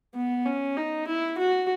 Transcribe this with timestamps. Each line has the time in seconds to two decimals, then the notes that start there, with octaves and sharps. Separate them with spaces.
0.15 B3
0.45 C#4
0.77 D#4
1.07 E4
1.38 F#4